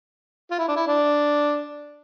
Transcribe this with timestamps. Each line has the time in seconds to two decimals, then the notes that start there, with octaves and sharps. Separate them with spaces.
0.51 F4
0.59 E4
0.68 D4
0.76 E4
0.87 D4